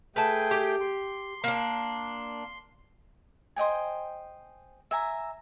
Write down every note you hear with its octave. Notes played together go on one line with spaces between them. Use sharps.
A3 G#4 B4 G5 A5
G4
C6
A#3 D4
C5 D#5 G5 G#5
E5 G#5 A#5